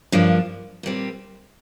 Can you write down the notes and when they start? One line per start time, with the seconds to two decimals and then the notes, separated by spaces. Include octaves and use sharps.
0.12 G2 F3 A#3 D4
0.83 A#2 G3 C4